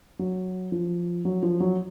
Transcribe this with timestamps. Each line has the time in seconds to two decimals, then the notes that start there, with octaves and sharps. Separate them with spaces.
0.19 F#3
0.72 F3
1.25 F#3
1.43 F3
1.60 F#3